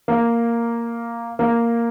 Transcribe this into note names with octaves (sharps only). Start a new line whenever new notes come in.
A#3
A#3